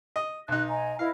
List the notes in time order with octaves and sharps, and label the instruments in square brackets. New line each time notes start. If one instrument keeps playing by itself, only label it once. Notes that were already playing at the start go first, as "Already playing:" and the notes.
[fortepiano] D#5
[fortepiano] B1 D#4 [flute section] F#6
[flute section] D#5 G#5 A#5
[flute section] E4 B4 D#5 [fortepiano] F5